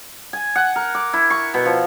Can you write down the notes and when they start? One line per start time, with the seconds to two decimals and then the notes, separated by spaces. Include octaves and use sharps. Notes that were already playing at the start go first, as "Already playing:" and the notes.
0.33 G#5
0.56 F#5
0.76 A#4
0.95 D6
1.13 E4
1.30 C#6
1.54 B2
1.65 F3